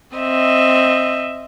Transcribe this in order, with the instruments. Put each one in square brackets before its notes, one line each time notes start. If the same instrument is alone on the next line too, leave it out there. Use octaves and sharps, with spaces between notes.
[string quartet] C4 D#5 E5